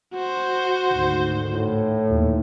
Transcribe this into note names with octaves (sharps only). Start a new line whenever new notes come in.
F#4 C5
D2 G#2 D#3
A2
D#2 A#2 E3